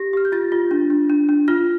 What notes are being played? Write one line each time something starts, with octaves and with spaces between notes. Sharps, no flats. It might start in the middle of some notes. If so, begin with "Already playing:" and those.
Already playing: G4 A#6
G4 F6
G6
F4 A6
F4
D4
D4
D4
D4
F4 F6